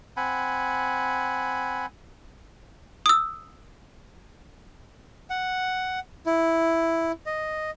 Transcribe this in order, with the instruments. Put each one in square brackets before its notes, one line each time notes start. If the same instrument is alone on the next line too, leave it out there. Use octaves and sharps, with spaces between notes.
[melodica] C4 F#5 G#5 B5
[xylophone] D#6 E6
[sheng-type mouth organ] F#5
E4
D#5